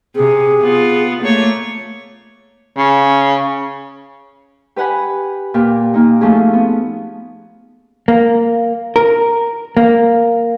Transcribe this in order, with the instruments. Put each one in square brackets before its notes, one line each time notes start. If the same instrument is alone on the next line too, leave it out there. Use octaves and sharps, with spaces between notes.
[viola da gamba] C3 [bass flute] G#4
[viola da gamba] B3 F4
A3 A#3 C#5
[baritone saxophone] C#3
[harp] G4 B4 F#5 G#5 B5
A#2 G4
A#2 A#3 D#4
F3 A3 C#4 G#4
B3
[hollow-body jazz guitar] A#3
A#4
A#3